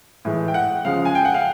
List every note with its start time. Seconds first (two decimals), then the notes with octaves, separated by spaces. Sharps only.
0.25 A2 E3 G#3
0.48 G5
0.54 F#5
0.85 C#3 F3 G#3 F5
1.05 G#5
1.15 G5
1.25 F#5
1.34 F5